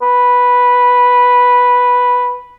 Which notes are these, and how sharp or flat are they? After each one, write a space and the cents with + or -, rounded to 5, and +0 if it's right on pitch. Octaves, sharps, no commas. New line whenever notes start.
B4 -5